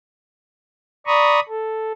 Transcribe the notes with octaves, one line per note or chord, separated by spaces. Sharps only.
D5 A#5 B5 C#6 D#6
A4